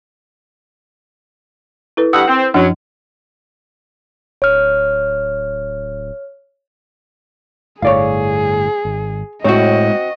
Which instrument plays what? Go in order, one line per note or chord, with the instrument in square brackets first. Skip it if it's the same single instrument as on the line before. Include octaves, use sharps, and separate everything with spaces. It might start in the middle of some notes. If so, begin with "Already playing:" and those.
[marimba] E4 A4 B4
[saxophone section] G2 F#5 [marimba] D#6 E6
[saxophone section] C4
[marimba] F#2 F3 D4 [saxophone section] F#3 C#4
[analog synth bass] D1 [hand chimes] C#5 F6
[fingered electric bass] G1 A2 [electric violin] G#4 [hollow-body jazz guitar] C#5 D5 F5
[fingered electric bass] G#1
[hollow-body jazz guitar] A2 C#5 [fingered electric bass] G#3 [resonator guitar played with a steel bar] C4 F#4 [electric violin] D#5